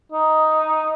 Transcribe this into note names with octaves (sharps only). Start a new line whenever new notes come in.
D#4